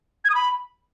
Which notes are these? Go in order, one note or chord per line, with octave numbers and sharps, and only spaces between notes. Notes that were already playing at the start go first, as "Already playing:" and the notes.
G#6
D#6
B5